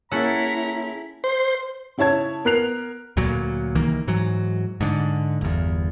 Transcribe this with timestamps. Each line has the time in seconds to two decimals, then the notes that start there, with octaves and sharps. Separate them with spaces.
0.12 A#3 C#4 E4 G#4 A4 C#5 F#5 A#5
1.24 C5
1.98 C#3 E4 C#5 A5 G#6
2.45 B3 A#4 F#6 C7 F7
3.17 D2 A#2 F#3
3.75 C2 D#3 E3 A#3
4.07 G#2 E3 F#3
4.81 G#2 D3
5.41 G1 E2